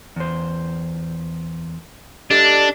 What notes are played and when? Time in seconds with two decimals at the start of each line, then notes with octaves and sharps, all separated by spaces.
0.16 E2 C5
2.31 D4 G4 A4 D#5